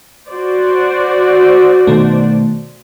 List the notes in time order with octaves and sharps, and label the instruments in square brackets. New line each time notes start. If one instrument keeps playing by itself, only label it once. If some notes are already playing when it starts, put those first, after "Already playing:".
[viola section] F#4 C5 D5
[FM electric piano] B2 D#3 A3